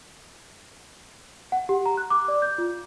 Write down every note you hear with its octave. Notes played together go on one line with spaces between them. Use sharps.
F#5
G4
A#5
F#6
D6
D5
G6
F4